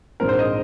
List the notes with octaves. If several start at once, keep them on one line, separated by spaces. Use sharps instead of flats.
A#1 G#2 G#3 C4 A#4
C5
D#5